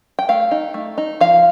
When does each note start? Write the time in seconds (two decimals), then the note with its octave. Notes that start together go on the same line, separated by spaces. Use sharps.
0.19 G5
0.28 A3 F5
0.51 D#4
0.74 A3
0.98 D#4
1.21 F3 F5